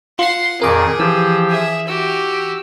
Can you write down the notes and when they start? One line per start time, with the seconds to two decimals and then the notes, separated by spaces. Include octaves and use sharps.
0.19 F4 F#5 C6 C7
0.61 F2 A#2 D#3 G#4 A#4 D6
0.99 E3 F3 G4 E6
1.50 G#4 E5
1.88 F#4 G4 E6